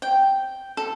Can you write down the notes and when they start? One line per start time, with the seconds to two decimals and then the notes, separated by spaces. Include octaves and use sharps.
0.02 G5
0.77 A4